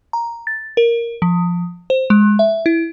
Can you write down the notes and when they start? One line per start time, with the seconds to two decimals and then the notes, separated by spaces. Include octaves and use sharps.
0.13 A#5
0.47 A6
0.77 A#4
1.22 F3
1.90 C5
2.10 G#3
2.39 E5
2.66 E4